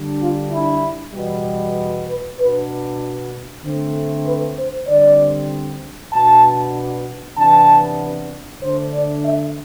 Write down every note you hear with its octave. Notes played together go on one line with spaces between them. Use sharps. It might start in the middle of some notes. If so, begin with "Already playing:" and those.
Already playing: D3 G3 D4
F4
E4
E2 B2 G3
B4
B2 B3 D4 B4
D3 A3 C4
B4
C5
D3 G3 C4 D5
B2 B3 D4 A5
C3 E3 B3 D4 A5
D3 A3 D4 C5
D5
E5